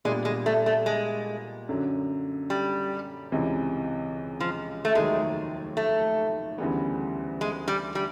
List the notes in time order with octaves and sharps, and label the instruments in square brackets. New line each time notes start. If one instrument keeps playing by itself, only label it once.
[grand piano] A#2 G3 B3 D4 [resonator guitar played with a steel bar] G#3
[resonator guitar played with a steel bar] G#3
A3
A3
G#3
[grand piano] F#2 D3 F#3
[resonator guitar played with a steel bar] G3
[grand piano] C#2 C3 E3
[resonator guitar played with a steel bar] F3
A3
[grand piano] F1 D#2 D#3 F#3 A3 [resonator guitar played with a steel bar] G#3
[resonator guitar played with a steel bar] A3
[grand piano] D2 C#3 E3 G3 B3
[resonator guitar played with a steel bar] G#3
G3
G3